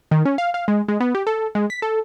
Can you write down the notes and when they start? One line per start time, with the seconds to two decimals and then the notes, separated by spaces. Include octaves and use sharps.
0.11 D#3
0.25 C#4
0.38 F5
0.54 F5
0.68 G#3
0.88 G#3
1.00 B3
1.15 G4
1.27 A4
1.55 G#3
1.70 B6
1.82 A4